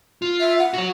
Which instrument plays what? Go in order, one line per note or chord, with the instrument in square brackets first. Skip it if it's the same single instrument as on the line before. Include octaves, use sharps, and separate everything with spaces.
[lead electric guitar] F4
[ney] E5
F#5
[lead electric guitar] F#4 C#5